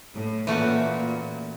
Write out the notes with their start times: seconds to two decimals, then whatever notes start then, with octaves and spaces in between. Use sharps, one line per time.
0.14 A2
0.47 A#2 E3 A3 C#4 F#4